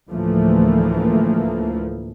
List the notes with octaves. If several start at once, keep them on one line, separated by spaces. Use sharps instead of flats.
D2 A2 E3 F3 A3 A#3